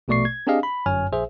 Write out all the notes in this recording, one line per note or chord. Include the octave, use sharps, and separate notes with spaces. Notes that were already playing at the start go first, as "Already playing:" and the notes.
A#1 B2 A3 D5 C#6 C7
G#6
C4 D4 G4 G#4 D#5 F5
B5
G1 F#2 C#5 G#5 F6
A#1 G#4 C5 E5